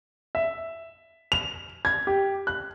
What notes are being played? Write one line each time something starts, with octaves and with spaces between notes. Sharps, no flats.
E5
F7
G#6
G4
F#6